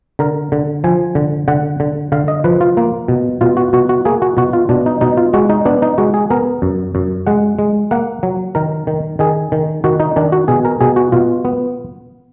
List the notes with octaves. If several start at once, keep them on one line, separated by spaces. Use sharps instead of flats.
D3 A#4
D3
F3 G#5
D3
D3 F#5
D3
D3 F5
D#5
F3 B4
F4
A#3
B2
B2 F4
F#4
B2 F#4
F#4
A#3 G#4
F#4
B2 F#4
F4
B2 D4
D#4
B2 D#4
F4
G#3 F#4
D#4
B3 D4
D#4
G#3 F#4
G#4
B3 A#4
F#2
F#2
G#3 F#5
G#3
A#3 F#5
F#3
D#3 A#4
D#3
D#3 G#4
D#3
D#3 F#4
D#4
D#3 D4
F#4
B2 G#4
A#4
B2 G#4
F#4
B2 F4
B3